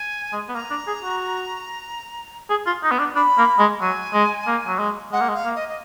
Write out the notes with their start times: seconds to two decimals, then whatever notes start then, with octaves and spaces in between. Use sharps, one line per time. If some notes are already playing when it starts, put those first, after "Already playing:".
Already playing: G#5
0.32 G#3
0.49 B3
0.54 A#3 A#5
0.70 D4
0.87 G#4
1.03 F#4
2.50 G#4
2.66 F4
2.83 D#4
2.91 B3
2.99 D4
3.15 D4 B5
3.38 A#3
3.59 G#3
3.81 F#3 G#5
4.14 G#3
4.47 A#3
4.67 F#3
4.79 G#3
5.12 G#3 F#5
5.20 A#3
5.29 G#3
5.34 F5
5.44 A#3
5.55 D#5
5.68 D#5